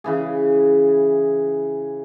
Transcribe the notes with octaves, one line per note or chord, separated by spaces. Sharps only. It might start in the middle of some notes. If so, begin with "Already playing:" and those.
C#3 E3 G#4